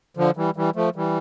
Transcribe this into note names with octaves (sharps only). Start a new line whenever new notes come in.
D3 F3
E3 G3
E3 G3
F3 A3
E3 G3